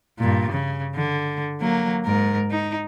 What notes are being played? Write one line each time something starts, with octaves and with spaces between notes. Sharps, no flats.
G2 A#2
C#3
D3
F#3 A#3
G#2 A#4
D#4